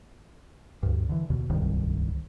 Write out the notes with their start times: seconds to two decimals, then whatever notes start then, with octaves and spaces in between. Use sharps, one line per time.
0.83 D2 G2
1.09 D3 E3
1.30 D#2 B2
1.49 D1 C2 G2 D#3